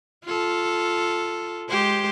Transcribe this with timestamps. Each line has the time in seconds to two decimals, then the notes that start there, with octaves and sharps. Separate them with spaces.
0.25 F4 A4
1.69 G#3 G4 C5